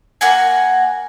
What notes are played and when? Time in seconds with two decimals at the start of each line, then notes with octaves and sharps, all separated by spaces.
0.21 A#3 F#4 F#5 G#5